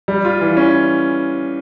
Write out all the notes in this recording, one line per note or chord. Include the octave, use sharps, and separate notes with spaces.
G3
F4
E3
C#4